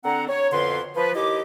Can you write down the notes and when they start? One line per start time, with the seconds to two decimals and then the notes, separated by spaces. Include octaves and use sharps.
0.04 D3 C4 F#5 A#5
0.28 C#5
0.51 F2 B2 D3 B4 C6
0.95 F3 B4
1.15 D#2 D#4 E4 G4 D#5 D6